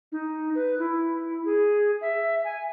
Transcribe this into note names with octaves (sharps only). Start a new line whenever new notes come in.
D#4
B4
E4
G#4
E5
G#5